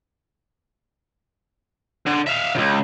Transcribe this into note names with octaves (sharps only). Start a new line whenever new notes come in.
D3
E5 F5
C#2 C#3